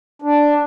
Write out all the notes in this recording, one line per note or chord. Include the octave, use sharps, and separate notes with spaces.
D4